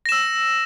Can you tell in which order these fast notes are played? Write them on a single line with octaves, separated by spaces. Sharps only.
A#6 E7 E6